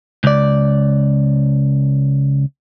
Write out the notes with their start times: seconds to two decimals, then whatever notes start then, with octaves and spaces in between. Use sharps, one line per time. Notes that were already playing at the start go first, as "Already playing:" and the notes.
0.24 C#2 D5